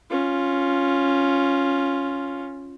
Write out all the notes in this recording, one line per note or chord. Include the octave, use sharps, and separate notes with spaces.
C#4 F4